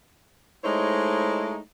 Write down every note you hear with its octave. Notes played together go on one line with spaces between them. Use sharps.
G#3 A3 D#4 E4 C5 C#5